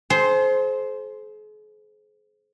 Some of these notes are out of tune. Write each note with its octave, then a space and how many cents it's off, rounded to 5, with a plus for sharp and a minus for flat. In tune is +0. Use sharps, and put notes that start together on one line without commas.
G#4 +45 C5 +0